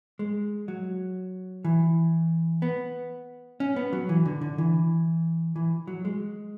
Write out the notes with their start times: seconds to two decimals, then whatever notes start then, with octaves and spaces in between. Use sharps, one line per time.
0.19 G#3
0.68 F#3
1.65 E3
2.62 B3
3.60 C#4
3.76 B3
3.93 F#3
4.09 E3
4.26 D3
4.41 D3
4.58 E3
5.56 E3
5.87 F#3
6.05 G#3